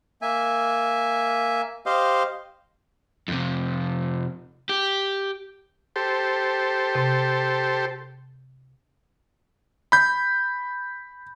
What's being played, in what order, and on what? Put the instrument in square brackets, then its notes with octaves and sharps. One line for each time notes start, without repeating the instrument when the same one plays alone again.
[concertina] A#3 E5 G#5
G4 C5 D#5 F5
[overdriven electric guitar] F2 C3
G4
[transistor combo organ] G4 A4 C5
[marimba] C3
[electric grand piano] B5 G6